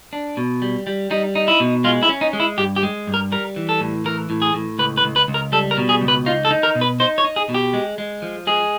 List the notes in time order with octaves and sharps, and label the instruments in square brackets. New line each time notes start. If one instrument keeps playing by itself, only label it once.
[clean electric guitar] D4
B2
G3
G3
G3 D#4
D#4
E4
B2
G#3 F4
E4
C#4
D#4
G#3
E4
G2 G4
G4
G#3
G2
A#4
G3 A#4
E3
A4
A2
E3 A#4
A2
G#4
A2
C#2 B4
B4
C#2
B4
C#2
A#4
G3 A4
A#4
B2
G#4
C#2
B4
D#4 F4
A4
D#4
A#4
B2
B4
D#4 C5
C#5
D#4
G#4
B2
G4
G#3
G#3
F3
G#3 G#4